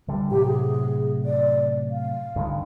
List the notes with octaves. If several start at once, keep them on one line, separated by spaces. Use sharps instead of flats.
D3 G3
A2 C3 F#3 G4
G#4
D5
F5
G2 D3 D#3